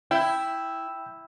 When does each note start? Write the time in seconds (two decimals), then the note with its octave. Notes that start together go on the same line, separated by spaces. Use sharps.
0.11 E4 G5 G6